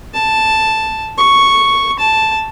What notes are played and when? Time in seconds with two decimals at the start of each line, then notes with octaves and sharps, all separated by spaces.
0.14 A5
1.18 C#6
1.99 A5